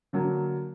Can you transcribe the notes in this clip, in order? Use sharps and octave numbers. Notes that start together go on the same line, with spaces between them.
D3 F#3 A#3